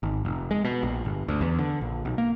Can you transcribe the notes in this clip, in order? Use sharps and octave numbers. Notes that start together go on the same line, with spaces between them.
G#1
F1
G#3
B2
A#1
G1
D2
E2
D3
A#1
B1
A#3